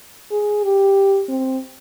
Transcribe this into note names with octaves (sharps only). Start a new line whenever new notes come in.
G#4
G4
C4